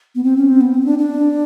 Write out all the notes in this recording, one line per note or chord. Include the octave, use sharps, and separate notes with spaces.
B3
C4
C#4
C4
B3
C4
C#4
D4
D4